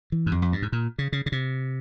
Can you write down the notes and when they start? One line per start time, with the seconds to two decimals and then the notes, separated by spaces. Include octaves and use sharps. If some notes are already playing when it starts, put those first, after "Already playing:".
0.12 E3
0.26 G2
0.32 F2
0.42 F2
0.52 G2
0.62 G#2
0.72 A#2
0.98 C#3
1.12 C#3
1.26 C#3
1.32 C3